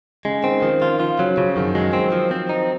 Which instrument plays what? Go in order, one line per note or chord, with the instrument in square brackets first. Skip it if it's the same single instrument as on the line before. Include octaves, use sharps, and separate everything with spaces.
[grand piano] C#3 [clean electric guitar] G#3
[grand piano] D#3 [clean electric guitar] C4
[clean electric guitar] D#3 [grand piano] F3
[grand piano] F3 [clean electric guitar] F4
[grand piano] F3 [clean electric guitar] F4
[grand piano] C#3 [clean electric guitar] F#3
[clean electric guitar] C#3 [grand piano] F3
[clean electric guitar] F#2 [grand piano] D#3
[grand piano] F#3 [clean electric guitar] G#3
[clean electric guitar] C4
F3
C4
D#4